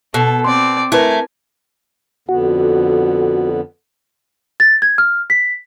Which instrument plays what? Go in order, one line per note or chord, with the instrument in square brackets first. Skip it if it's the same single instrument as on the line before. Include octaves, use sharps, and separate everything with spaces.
[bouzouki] B2 [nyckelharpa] A4
[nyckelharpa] C4 D5 [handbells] C6
[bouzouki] A3 [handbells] E4 B4 [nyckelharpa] A#4 G#5
[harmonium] F2 D3 B3 [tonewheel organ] F#4
[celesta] A6
G#6
F6
B6